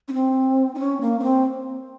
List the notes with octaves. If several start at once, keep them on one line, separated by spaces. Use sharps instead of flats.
C#4
C4
D#4
C#4
A#3
C#4
C4